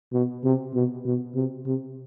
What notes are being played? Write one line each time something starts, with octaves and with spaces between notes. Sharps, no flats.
B2
C3
B2
B2
C3
C3